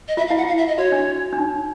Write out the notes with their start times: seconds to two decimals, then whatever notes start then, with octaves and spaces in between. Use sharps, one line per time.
0.08 D#5
0.17 F4 E5
0.28 F5
0.31 E4
0.37 F#5
0.43 F4 F5
0.58 E5
0.68 D#5
0.78 F#4 C#5
0.92 D4
1.33 D4
1.38 D#4